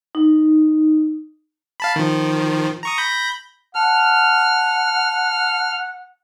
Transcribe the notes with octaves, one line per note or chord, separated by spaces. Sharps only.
D#4
F5 A5 B5
D#3 F3
A#5 C#6 D#6
B5 G6 A#6
F#5 A5 F6